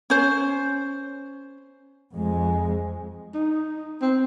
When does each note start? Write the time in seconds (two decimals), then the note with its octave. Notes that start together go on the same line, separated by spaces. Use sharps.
0.10 C#4 C5
2.15 F2 G#3
3.35 D#4
4.02 C4